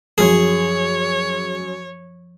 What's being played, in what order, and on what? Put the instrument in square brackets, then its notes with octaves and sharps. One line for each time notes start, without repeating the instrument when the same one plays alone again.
[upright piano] F#2 F#3 [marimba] F3 [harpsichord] G#4 [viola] C#5